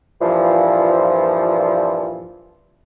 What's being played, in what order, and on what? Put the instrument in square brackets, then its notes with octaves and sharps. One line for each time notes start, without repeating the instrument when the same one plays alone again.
[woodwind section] G2 A#2 E3 F3